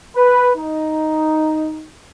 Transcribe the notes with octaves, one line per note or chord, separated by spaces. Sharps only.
B4
D#4